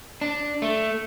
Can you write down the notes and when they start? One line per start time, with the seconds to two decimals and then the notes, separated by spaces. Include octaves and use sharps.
0.21 D4
0.62 A3